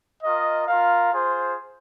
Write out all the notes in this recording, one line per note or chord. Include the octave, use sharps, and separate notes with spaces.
F4 A#4 D#5
F4 A#4 F5
F4 G#4 C5